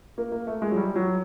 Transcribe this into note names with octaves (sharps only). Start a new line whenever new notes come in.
A#3
A#3
A3
G#3
F#3
G3
F#3